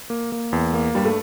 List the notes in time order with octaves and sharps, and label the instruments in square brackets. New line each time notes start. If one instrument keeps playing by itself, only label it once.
[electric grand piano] A#3
A#3
E2
A#3
[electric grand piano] G2 [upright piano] G3
[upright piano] A3